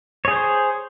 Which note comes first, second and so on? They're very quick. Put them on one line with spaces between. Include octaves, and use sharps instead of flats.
C#5 G#4 C5